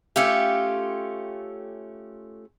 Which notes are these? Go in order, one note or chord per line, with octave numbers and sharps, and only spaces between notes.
A3 C#4 F4 G4